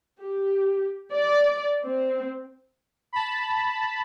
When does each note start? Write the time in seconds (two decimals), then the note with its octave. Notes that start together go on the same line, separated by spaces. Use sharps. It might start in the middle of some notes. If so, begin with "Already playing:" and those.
0.21 G4
1.13 D5
1.84 C4
3.13 A5 B5